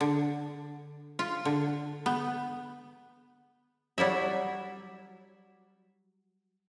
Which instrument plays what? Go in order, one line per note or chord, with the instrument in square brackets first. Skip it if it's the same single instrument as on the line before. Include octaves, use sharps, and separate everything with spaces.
[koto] D3
F4
D3
B3
F#3 G3 E4 E5